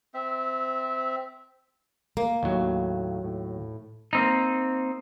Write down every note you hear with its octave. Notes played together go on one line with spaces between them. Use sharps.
C4 E5
A#3
D#2 A2 F#3
A2
A#3 C4 D#4